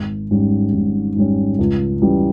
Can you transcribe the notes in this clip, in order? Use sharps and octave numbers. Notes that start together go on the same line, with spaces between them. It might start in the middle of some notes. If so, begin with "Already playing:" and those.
Already playing: G#1
G#2 G3 C#4
G#1
G#2 G3 C#4
C#2
C#3 E3 G3